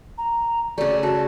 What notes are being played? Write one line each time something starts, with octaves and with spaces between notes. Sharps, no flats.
A#5
C#3 A3 D5
F#4 A5